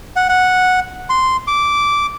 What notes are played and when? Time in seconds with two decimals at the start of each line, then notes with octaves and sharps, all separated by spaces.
0.16 F#5
0.29 F#5
1.10 C6
1.47 D6